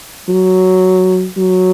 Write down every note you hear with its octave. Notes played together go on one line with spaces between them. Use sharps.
F#3
F#3